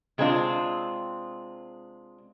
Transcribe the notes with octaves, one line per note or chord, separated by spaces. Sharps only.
C3 G#3 B3 C4 D4 F4